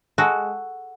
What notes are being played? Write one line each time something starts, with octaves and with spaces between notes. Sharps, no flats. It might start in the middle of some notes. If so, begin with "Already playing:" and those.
G#3 F#4 A4